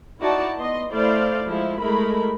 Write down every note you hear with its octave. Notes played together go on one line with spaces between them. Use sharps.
D#4 E4 F#4 D5 A5
B3 D#5 C6
A3 E4 C5 D5 F5
F3 G#3 E4
G#3 A3 E4 G#4 A#4 B5